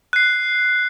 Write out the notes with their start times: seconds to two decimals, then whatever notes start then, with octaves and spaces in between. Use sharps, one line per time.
0.13 F#6 C7